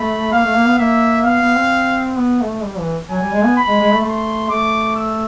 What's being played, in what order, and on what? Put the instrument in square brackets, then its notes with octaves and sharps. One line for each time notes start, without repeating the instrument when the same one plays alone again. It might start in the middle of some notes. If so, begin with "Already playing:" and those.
Already playing: [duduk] A3 [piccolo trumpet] B5
[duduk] A#3 [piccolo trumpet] F5
[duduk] A3
A#3
B3
[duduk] A#3 [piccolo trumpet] E5
[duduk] B3 [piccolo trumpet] F5
[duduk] B3
C4
B3
A3
G3
E3
[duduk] F#3 [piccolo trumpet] G#5
[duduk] G3
G#3
B3
[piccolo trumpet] B5
[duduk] G#3
G#3
A3
[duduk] A3 [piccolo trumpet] C6
[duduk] A3 [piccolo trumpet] D6
[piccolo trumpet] E6